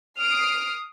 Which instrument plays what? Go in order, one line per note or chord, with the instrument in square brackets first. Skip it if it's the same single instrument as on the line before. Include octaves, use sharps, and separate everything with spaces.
[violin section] D#6 F6 C7 D7